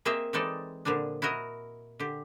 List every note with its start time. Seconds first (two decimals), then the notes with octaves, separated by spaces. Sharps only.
0.05 A#3 C4 G#4 C5 D#5 E5
0.33 E3 G#3 C4 D#4 A4 D5
0.85 A#2 D3 F3 G3 D4
1.22 E4 F#4 A#4 D#5
2.00 D3 G4